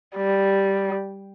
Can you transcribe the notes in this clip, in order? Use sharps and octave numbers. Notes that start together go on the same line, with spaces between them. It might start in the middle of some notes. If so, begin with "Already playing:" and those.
G3